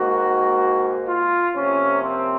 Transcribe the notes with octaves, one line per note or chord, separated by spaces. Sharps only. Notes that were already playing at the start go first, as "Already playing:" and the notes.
Already playing: G#2 D#3 A#3 F#4
F4
C3 F3 A#3 C#4
C4